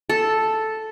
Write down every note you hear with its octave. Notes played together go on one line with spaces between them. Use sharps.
A4